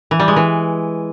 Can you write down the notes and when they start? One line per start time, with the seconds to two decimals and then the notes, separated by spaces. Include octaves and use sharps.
0.11 E3
0.19 G3
0.28 G#3
0.36 E3